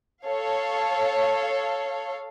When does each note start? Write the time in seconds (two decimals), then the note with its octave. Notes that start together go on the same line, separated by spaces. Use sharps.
0.24 A4 C#5 F5